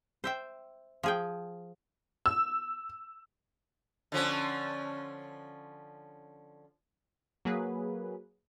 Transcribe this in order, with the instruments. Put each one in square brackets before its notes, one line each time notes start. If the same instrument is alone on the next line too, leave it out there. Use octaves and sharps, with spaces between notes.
[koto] C5 E5 G5
F3 G#4 G5
[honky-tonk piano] E6
[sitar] D3 F3 C#4
[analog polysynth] F#3 A#3 G#4 B4